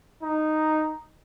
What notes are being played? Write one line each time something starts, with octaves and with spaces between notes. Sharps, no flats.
D#4